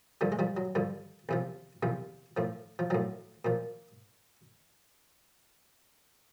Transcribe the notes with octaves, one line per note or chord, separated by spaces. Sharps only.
G2 D3 F3 G3
G#3
F3 G3
F#3
G2 D3 F3
E2 C3 F3
E2 C3 F3
A2 F3
F3
A2 F3 F#3
A#2 F3